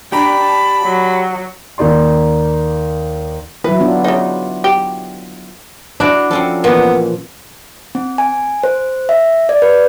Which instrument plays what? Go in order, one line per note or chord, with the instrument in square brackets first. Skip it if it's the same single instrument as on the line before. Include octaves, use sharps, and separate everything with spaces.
[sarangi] D4 [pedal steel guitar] G4 D5 A#5 [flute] B5
[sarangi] A5
F#3
[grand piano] D#2 A#3 D#4 D5 C6
[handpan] F#3 E4 [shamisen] B4
[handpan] B3 D4 F4
[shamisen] C#3 D#4
G4
[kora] D4 [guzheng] E4 F#4 D5
[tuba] F3 [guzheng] C4 C#4 A4
[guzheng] A#2 E3 [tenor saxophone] B3
[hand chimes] C4
G#5
C5
E5
D5
B4